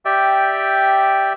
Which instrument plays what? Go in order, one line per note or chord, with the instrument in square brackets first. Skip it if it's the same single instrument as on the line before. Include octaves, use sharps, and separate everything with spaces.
[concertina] G4 D5 E5 G5